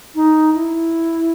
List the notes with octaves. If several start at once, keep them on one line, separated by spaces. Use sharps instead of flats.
D#4
E4